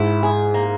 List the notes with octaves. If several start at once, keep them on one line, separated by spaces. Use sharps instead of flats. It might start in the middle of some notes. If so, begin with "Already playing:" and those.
Already playing: G#2 E4
G#4
A#3